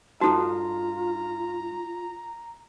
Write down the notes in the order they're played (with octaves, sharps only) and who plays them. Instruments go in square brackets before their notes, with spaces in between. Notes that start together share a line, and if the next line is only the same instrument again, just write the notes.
[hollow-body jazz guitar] G2 D#4 A5 [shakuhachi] F4 [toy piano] F#4 A4 [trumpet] A#5